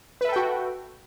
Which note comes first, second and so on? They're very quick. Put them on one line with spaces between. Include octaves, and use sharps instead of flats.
B4 E5 A4 G5 F#4